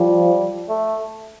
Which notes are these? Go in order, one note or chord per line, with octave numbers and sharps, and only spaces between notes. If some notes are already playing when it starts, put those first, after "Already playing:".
Already playing: F3 G3
A3